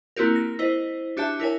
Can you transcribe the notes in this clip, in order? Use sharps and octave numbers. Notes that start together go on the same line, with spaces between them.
A#3 C4 E4 F#4 G4 A#4
A#6
E4 C5 D#5
D4 F#4 G4 E5 A5
E4 A#4 C#5 G#5